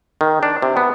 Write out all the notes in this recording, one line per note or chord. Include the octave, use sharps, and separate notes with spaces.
D#3
D4
C3
B3